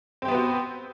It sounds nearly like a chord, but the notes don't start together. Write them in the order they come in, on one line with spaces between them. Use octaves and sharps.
C4 G4 B3 B4 F#4